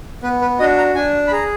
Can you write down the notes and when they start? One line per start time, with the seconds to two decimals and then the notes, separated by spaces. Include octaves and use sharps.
0.23 B3 B4
0.41 B4
0.59 D4 F#4 D#5
0.78 A#5
0.95 D4 G#5
1.27 B5
1.32 G#4 A#5